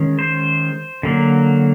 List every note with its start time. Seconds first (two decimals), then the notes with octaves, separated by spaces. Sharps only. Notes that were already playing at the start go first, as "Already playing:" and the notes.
Already playing: D#3 G#3 C#4
0.19 C5
1.03 D3 F#3 A#3